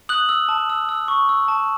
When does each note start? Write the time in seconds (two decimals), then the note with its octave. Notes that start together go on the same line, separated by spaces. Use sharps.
0.09 D#6 F#6 F#7
0.29 E6
0.49 A5
0.69 E6
0.89 E6
1.08 C#6
1.29 E6
1.48 A5